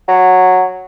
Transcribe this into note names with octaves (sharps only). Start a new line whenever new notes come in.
F#3